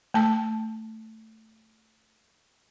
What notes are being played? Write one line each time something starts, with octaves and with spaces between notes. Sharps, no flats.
A3 A5